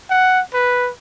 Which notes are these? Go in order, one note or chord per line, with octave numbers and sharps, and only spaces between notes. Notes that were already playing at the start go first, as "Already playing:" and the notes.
F#5
B4